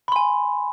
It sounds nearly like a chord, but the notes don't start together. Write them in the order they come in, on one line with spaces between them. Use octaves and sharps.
B5 C6 G#5